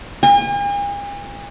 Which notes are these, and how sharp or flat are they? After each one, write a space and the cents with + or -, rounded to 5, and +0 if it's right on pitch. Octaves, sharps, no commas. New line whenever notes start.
G#5 -45